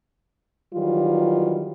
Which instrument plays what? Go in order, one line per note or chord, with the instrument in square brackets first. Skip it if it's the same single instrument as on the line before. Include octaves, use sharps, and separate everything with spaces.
[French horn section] D#3 E3 F#3 G3 F4